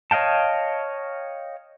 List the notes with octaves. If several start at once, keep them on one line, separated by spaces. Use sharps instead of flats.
C#5 D#5 F5 G5 A5